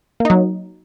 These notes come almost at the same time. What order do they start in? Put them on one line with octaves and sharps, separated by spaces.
A#3 D#4 F#3